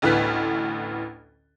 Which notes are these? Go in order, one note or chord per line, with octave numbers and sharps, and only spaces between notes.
A1 D2 A2 B3 F#6 B6